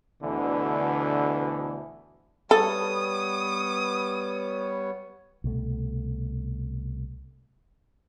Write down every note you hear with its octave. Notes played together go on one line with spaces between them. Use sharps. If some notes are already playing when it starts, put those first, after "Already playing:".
D2 B2 D3 E3
G3 B3 A4 C#5 D#6
C2 B2 A3